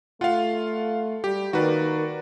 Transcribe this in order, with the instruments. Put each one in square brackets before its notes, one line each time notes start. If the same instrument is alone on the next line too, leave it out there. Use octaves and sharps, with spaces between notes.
[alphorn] A3 [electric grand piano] F4 F5 [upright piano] F#5
[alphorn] G3 [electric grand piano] G4
[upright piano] D#3 A#3 [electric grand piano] F#4 B4 D5 [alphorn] A#4